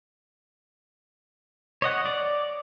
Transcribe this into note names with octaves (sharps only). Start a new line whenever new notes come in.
C#5 D#5 F#5
D5